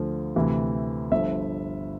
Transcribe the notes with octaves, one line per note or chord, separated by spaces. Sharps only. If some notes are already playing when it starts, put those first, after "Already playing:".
Already playing: D2 D3 F3
D2 C3 E3
G1 G2 D3 F3 E5